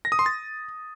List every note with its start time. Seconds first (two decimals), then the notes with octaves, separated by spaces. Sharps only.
0.05 A#6
0.12 D#6
0.19 C6
0.26 A6